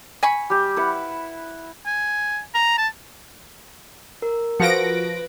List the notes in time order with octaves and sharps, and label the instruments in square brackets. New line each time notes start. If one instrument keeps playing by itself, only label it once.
[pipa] G#5 B5 C#6
[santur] G3 G4
E4 B4 F#5
[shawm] G#5
A#5
A5
[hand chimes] A#4
[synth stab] F3 A#6 D7 [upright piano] F#4 C#7 [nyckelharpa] B4